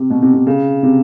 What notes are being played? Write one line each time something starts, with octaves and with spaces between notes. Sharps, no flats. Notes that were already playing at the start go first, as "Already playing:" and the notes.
Already playing: C3
B2
C3
C3
C#3
C3